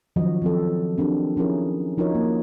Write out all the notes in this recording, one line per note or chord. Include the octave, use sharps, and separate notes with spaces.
D#3 F3 F#3 C#4 F#4 D#5
F3 C4 A4
C4 D4 G4 A#4
F3 C#4 E4 G#4 A#4
F3 D#4 F4 F#4 A#4 C#5
A#3